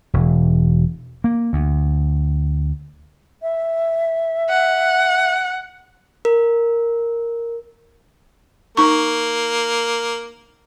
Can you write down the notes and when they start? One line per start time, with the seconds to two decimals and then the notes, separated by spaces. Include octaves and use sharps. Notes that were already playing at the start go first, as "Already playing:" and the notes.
0.14 E1
1.24 A#3
1.53 D2
3.42 E5
4.49 F#5
6.25 A#4
8.77 A#3 D#4 C#6